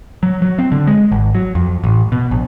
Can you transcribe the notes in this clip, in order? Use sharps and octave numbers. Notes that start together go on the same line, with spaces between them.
F#3
F#3
C4
D3
G#3
G#1
F#3
F2
A1
B2
A#1